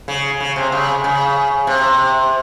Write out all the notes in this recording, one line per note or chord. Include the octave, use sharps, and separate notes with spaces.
C#3
C#3
C3
C#3
C#3
C3